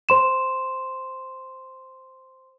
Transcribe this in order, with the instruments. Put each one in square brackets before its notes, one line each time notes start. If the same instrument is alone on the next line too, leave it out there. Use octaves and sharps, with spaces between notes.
[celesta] C5 C6 E7